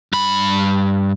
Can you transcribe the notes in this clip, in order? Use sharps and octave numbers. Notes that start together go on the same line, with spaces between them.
G2 B5